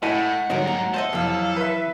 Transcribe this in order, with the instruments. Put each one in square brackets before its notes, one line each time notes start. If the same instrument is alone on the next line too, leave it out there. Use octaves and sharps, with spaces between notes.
[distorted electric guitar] A2 [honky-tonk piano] E4 [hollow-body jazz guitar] D#5 G#5 A5 [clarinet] F#5
[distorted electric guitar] G#2 A#4 [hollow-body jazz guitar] D3 G3 D#4 [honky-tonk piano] F#3
[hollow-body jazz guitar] A#3 [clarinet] F#5
[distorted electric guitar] A4 [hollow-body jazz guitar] C5 D#5 E5
[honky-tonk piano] F2 F5 [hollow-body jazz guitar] C3 E3 [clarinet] F#3
[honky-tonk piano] B4 E5